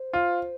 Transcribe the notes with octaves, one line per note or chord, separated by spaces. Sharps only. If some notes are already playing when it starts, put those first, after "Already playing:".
Already playing: C5
F4